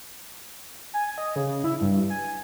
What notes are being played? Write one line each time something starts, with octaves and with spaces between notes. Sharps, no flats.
G#5
D#5
C#3
E4
G2
G#5